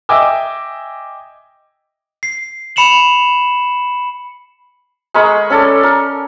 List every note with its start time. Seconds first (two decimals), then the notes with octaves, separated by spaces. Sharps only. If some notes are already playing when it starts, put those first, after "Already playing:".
0.09 D#5 E5 G5 G#5 D6 E6
2.23 C7
2.76 B5 C#7 E7 F#7
5.14 G#3 A#4 B5 C#6
5.50 C#4 A4 D5
5.83 A#4